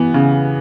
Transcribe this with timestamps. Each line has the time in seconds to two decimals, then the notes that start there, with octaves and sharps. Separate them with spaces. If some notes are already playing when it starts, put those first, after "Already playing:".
Already playing: E3 B3
0.14 C#3